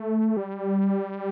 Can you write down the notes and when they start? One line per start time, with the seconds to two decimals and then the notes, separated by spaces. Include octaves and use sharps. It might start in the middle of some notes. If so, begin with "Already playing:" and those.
Already playing: A3
0.37 G3